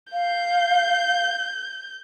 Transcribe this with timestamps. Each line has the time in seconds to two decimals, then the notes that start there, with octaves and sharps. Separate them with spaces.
0.13 F5 G6